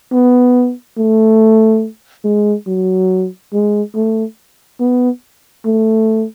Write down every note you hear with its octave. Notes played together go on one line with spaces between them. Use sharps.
B3
A3
G#3
F#3
G#3
A3
B3
A3